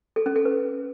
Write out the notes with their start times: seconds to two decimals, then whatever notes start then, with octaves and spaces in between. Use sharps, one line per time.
0.16 A4
0.26 C#4
0.36 A4
0.45 B4